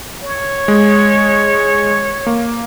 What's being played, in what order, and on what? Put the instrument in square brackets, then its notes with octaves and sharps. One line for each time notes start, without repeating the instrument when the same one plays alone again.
[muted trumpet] C#5
[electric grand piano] G#3
A#3